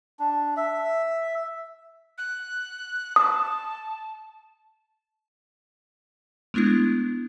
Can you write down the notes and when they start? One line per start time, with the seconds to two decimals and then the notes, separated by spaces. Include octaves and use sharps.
0.19 D4
0.57 E5
2.18 F#6
3.16 A5 D#6
6.54 G#3 A3 B3 D4 E4